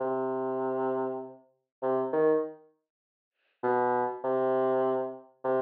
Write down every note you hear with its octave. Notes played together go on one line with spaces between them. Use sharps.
C3
C3
D#3
B2
C3
C3